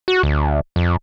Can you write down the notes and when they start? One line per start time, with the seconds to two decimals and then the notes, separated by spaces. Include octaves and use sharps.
0.08 F#4
0.23 D2
0.76 F2